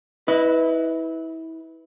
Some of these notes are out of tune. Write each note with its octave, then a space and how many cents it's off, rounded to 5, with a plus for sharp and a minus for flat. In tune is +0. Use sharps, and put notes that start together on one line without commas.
E4 -30 B4 +0 D#5 +0